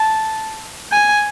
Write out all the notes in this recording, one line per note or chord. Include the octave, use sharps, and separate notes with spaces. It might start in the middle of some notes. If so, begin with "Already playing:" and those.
Already playing: A5
G#5